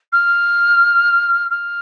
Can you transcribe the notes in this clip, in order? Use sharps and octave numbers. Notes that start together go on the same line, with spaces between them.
F6
F6